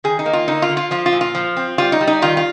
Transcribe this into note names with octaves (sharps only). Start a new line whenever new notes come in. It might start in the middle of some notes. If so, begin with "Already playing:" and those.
D#3 G#4
D#4
A#3
F4
D3 D#4
F4
D3
F4
F3 F4
F4
A#2
F4
F3
C4
G3 F4
D#4
G3
D#4
D#3 F4
F4